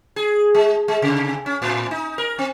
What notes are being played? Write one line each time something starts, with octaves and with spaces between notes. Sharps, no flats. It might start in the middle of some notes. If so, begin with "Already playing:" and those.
G#4
G#3
G#3
C3
C#4
A2
D#4
A#4
C4